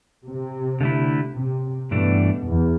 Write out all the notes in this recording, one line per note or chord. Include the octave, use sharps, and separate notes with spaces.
C3
D3 A3 E4
C3
G2 B2 E3 A3 D4
E2